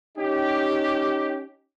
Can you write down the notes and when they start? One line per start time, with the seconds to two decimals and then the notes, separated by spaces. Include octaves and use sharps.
0.17 C#4 D#4 G4